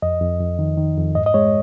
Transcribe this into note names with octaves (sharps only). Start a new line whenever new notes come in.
F2 D#5
F2
F2
D#3
D#3
F2
G#2 D#5
D#5
G#3 C#5